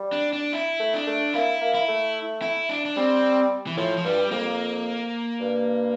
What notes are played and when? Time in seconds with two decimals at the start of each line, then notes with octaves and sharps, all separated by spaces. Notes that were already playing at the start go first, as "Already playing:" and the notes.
Already playing: G3
0.12 D4
0.33 D4
0.53 E4
0.79 A3
0.94 D4
1.07 A3
1.34 A#3 E4
1.61 A#3
1.75 E4
1.88 A3
2.42 E4
2.69 D4
2.85 D4
2.96 G3 C4
3.67 E3
3.77 A2 F3
3.97 F3
4.04 G2 G3
4.31 F2 A#3
5.40 G2